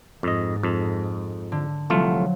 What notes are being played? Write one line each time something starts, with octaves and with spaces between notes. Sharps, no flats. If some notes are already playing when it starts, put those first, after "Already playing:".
F2 G#2 D#5
F2 A4
D3
C2 F3 F#3 A3 F4